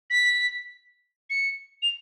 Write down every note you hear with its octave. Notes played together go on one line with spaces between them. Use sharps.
B6
C#7
F7